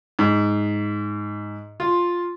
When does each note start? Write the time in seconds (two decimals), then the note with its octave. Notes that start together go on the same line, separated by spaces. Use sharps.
0.19 G#2
1.80 F4